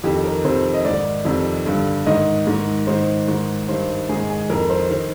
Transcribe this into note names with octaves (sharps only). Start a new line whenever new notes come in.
F2 D#3 G4
A#4
F2 C3 D#3 C5
D#5
G#2 D#3 D5
F2 C3 D#3
G2 D3
G#2 D#3 D#5
G#2 D#3
G#2 D#3 C5
G#2 D#3
G2 D#3 C5
G#2 D#3 G#4
G#4
F2 D#3 A#4
C5
D#3 C5